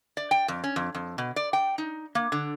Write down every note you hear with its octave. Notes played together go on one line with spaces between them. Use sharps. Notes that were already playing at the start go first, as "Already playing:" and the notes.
D5
G5
F2
C#4
F2
F2
B2
D5
G5
D#4
A#3
D3